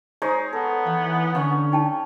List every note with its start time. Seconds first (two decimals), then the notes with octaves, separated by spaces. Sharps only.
0.22 G#3 D#4 C5 C#5
0.53 B3 A4
0.87 E3 F5
1.35 D3 C#4 F5 C#6
1.72 D#4 G5 A5